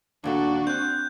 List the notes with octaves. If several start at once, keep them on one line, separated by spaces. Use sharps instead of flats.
D#2 A#2 D4 F#4 A4
C4 F#6 G6